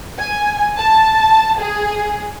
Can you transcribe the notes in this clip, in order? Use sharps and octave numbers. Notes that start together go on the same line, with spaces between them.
G#5
A5
G#4